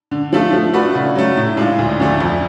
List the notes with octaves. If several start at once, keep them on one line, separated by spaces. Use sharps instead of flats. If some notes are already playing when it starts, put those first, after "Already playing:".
D3
F3 A3 F4 A4
F3
A3 D4 F#4 B4
C#3
F#3 A3
A2
G#3 D4 F4
D2
D3 F3 A3 D4
F2